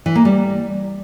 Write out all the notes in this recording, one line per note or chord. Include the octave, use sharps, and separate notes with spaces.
E3
A#3
G3